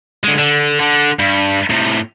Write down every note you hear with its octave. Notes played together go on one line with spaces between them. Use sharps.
D3 G#3
D3
D3
G2
A2 C3